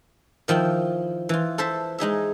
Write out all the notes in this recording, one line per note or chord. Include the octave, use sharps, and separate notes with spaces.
D#3 F3 E4 G5
E3 F4
A4 C5 E5
G#3 D#4 G#4 E5